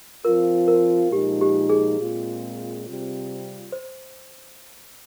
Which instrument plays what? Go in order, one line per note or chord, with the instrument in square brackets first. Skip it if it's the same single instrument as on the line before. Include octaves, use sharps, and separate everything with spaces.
[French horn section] F3 C4 F4 [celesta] A#4
[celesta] A#4
[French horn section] A#2 F3 G#3 D#4 [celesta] G4
[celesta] G4
G#4
[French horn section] A#2 G#3 C4 F4
C3 G3 C4 F4
[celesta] C5